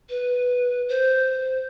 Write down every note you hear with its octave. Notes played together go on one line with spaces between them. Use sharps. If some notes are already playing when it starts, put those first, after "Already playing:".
B4
C5